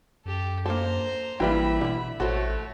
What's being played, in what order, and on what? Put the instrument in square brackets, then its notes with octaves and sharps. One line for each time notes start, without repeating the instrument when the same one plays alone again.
[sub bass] F#2 [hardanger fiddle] G4 A4
[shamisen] A#3 D4 A4 [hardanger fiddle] C5 A#5
[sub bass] A1 [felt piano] E3 G3 [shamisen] A#3 B4 G5 [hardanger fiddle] E5 B5
[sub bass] B2 [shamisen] D3 E4
[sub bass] A1 [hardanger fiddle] A3 C#5 [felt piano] F#4 [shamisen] A4 C5